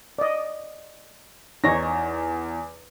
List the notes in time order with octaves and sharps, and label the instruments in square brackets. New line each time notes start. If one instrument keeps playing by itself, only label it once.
[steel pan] D5 D#5
[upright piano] E2 A#6 [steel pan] D#4 C#5